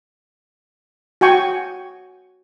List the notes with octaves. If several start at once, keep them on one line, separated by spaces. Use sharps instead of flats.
F#4 G5 G#5 C#6